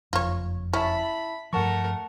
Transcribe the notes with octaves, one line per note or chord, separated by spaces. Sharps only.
F#1 F2 F4 C#5
C#4 E4 E5 A5 B5
G2 F3 A3 A#4 F#5 A5 C#6